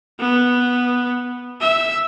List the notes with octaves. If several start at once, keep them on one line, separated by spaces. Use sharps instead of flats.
B3
E5